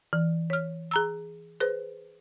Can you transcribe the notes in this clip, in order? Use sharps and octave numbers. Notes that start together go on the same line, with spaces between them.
E3
C#5 F6
G#4 A#5 E6
G#4 B4 C5